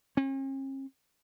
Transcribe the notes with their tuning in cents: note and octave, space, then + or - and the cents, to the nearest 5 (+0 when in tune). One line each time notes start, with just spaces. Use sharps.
C#4 -45